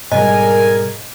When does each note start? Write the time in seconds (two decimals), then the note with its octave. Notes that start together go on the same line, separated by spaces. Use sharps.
0.12 G#2 B2 D3 G3 G#4 A#4 D#5 G#5